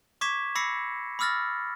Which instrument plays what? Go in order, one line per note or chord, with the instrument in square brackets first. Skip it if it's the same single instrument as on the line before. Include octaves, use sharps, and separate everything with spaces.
[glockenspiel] C#6 D6 G#6 B6 E7
B5 D6 E6 A#6 C7 C#7
B5 D6 E6 F6 A6 A#6